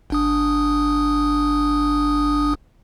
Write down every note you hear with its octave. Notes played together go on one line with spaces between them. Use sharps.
G1 D4 D#6